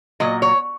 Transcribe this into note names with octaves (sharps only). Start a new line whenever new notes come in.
A#2 F#3 A#3 D#5
C#5